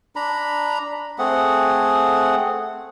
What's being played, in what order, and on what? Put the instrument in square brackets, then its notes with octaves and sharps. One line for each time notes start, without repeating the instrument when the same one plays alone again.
[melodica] D4 A#5 B5
A3 C4 G#4 F#5